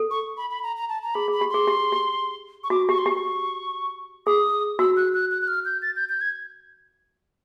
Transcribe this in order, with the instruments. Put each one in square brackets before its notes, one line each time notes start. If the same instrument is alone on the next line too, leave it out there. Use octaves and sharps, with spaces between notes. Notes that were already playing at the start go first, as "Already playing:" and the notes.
Already playing: [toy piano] A4
[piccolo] C#6
B5
B5
A#5
A#5
A5
A#5
[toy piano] G#4 [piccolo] B5
[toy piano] G#4
[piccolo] B5
[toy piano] G4
[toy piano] G#4 [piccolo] C6
[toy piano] G4
G4
[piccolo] C#6
[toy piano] F#4 [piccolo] D6
[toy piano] G4 [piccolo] C#6
[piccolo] C6
[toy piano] G4 [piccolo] C#6
[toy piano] G#4 [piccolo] D#6
[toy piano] F#4 [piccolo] E6
[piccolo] F#6
F#6
F#6
F#6
F6
G6
A6
G6
G6
G#6